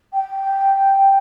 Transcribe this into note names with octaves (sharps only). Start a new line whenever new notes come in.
G5